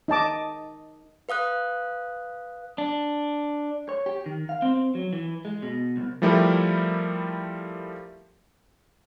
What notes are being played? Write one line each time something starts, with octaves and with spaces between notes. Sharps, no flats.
D#4 D#5 A5 D6
B4 F5 D#6 F#6
D4
C#5
G4
D#3
F5
C4
F#3
E3
G#3
B2
C2
F3 G3 A3 E4 G4 A#4